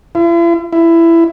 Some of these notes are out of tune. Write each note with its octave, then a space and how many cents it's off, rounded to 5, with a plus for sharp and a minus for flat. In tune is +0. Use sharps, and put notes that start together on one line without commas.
E4 +45
E4 +15